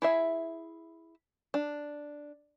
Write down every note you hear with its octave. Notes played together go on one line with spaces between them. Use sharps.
E4 G#4 E5
D4